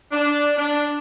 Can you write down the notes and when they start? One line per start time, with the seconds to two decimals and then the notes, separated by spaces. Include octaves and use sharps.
0.12 D4
0.58 D4